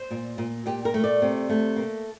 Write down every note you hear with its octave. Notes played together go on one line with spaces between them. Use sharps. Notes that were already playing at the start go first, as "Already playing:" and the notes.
Already playing: C5
A#2
A#2
A#2 G4
A#4
A3
D5
C3
A3
A#3